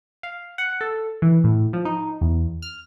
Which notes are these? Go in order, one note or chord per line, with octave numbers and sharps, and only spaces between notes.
F5
F#5
A4
E3
A2
F3
D#4
E2
F6